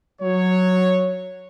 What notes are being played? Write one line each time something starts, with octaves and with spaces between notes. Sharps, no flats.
F#3 C#5